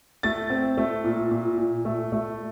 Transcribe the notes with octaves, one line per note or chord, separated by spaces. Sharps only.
A3 A6
C4
A3
A#2
A#2
A#2
A3
A3